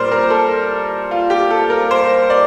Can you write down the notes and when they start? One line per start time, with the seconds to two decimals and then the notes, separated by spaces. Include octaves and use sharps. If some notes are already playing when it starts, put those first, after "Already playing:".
Already playing: A#2 G3 A#4 C5 D5
0.12 A#4
0.30 A4
1.11 F4
1.30 G4
1.51 A4
1.70 A#4
1.91 C5
2.30 D5